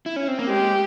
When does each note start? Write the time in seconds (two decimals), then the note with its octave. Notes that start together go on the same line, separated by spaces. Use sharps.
0.06 E4
0.16 C#4
0.28 C4
0.39 A#3
0.49 G#3 G4